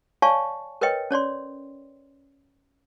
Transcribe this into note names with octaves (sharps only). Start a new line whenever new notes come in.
C#5 D5 F5 G#5 A5 C#6
A#4 B4 C#5 D#5 G5
C#4 C#5 D5 C6